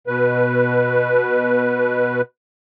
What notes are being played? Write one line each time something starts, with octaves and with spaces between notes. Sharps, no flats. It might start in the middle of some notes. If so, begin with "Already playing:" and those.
B2 B4